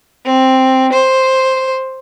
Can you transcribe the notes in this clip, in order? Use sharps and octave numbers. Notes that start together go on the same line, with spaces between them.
C4
C5